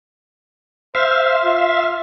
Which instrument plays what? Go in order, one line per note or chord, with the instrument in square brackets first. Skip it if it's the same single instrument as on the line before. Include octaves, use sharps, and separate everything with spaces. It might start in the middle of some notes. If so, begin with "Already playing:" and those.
[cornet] C5 [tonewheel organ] E5 F5
[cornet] F4